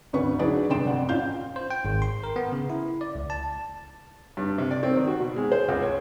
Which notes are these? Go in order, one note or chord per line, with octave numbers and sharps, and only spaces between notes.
G#1 D2 B4 C#6
F#3 D4 D#4 G#4 B4 D5
F1 G2 D5 G5 C6 E7
F2 F#5
A1 C#4 F4 F5 G6
C5
G5
G#1
C6
A#4
B3
C#3
E4
D5
C#2
A5
G2
C3
D5
C4
D#3
F#4
B2
G#3
C5
C#2
C#5